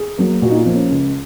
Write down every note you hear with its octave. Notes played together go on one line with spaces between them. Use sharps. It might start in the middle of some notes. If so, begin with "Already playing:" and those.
Already playing: G#4
F#3 A#3
A#2 F#4
D#4
F4
F3 A#3
C#4
C#2